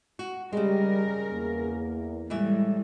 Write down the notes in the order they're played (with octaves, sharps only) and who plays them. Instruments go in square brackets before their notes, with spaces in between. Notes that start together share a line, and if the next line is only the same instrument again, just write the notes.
[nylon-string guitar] F#4
[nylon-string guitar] C#3 G#3 [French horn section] G3 [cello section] A#4
[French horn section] E2 A#3
[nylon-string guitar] A2 E3 E5 [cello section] G3 G#3